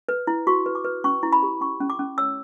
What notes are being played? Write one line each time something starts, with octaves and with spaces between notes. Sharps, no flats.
B4
E4
F#4 C#6
B4
D6
B4
C#4 C#6
E4
B5
G4
C#4 C#6
C#4
D6
C#4
C#5 E6